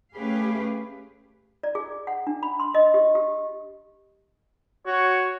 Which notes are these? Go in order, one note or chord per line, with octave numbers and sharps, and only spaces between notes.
A3 C#4 G4 G#4 B4 F5
D5
G#4
F#5
D4
B5
C6
D#5
G4
G4
F#4 C#5